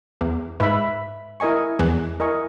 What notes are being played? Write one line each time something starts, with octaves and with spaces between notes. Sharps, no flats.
E2 E3
G#2 G#3 B4 E5 B5
E4 A#4 D#5 G#5 C#6
E2 E3
E4 A#4 D#5 G#5 C#6